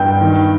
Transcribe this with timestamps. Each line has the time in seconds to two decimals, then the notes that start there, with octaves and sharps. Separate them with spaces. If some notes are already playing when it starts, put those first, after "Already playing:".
Already playing: G2 G5
0.21 D#3